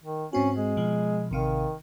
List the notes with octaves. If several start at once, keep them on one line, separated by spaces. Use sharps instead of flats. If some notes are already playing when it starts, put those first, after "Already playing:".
D#3
G#2 C4 C#4 F#4
G#3
B2 F3
A1 C3 D#3 F5